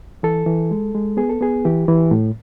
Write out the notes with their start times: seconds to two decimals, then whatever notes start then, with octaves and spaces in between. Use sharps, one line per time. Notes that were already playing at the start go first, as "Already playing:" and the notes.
0.23 E3 A4
0.46 E3
0.71 G#3
0.95 G#3
1.17 B3 G#4
1.29 A4
1.41 B3 G#4
1.65 E3 G4
1.88 E3
2.11 A2